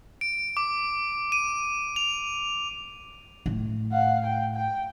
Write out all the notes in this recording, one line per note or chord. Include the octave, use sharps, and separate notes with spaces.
D7
D6
D#7
F7
A2
F5 F#5
G5
G5